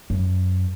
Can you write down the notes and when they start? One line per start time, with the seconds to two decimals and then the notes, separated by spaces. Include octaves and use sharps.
0.10 F#2